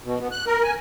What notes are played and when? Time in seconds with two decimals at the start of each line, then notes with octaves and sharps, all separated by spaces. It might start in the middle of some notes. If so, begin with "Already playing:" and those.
0.04 B2
0.20 B3
0.32 F#6
0.47 A#4
0.63 G#5